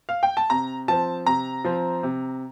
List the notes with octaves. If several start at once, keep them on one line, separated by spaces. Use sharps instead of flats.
F5
G5
A5
C3 A#5
F3 C4 A5
C3 A#5
F3 C4
C3